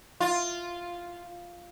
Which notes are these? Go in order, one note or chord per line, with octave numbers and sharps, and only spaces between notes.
F4